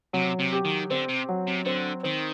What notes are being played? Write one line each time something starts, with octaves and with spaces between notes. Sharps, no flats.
C3 F#3
C3
G4
D#3
D3 C4
C3
F#3
C3
D3 C4
D#3 C4